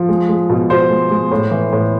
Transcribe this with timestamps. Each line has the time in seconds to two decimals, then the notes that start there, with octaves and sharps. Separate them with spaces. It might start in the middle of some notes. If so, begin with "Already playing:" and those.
Already playing: F3
0.09 G#3
0.29 G#3
0.49 B2
0.70 B2 C5
0.90 G#3
1.11 G#3
1.31 A2
1.51 E3
1.72 A2